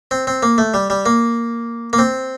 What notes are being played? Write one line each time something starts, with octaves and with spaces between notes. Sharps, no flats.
C4
C4
A#3
A3
G3
G3
A#3
A#3
C4